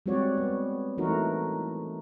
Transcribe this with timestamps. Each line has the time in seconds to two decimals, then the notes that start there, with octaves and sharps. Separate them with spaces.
0.06 G3 G#3 C4 F#4 C#5 D5
0.38 B3
0.98 E3 A3 D#4 F#4 A#4